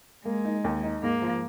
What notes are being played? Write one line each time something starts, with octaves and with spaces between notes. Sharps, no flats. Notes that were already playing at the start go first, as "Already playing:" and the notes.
G#3 A#3
D#4
D#2
D#4
G#2 A#3
F3